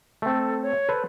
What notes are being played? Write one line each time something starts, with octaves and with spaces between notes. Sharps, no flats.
A3 C4 A4
C#5
A4 B4 C5